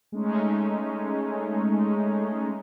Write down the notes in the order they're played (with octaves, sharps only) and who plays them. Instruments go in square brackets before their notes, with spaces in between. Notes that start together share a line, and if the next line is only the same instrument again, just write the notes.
[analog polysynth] G#3 A3 C#4 D#4